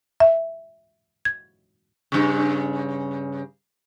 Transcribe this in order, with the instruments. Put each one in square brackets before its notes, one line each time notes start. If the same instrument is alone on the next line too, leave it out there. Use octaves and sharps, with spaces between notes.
[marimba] E5
G#6
[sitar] G2 C#3